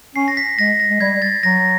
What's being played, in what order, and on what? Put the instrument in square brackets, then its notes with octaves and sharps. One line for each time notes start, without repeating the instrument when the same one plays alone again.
[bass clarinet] C#4 [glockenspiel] C7
[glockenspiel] A#6
B6
[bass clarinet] G#3 [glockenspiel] A#6
[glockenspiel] A#6
[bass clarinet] G#3
[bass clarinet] G3 [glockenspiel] G#6
[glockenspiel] A6
[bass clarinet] F#3 [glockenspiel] A#6